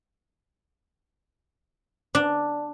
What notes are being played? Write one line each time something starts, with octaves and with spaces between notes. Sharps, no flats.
D4